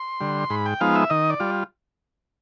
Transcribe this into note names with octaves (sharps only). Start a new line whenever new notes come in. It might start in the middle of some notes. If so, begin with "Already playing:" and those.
Already playing: C6
D3 G3
G#2 B5
G5
F3 G#3 B3 D#4 F5
E5
D#3 D#5
D5
G3 F4